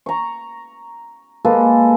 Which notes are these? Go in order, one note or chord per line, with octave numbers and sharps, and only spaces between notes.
A#5 C#6
G#3 A#3 A4 B4